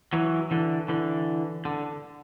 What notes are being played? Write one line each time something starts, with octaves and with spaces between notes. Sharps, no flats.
E3 F#3
D3 E3
D3 E3
D3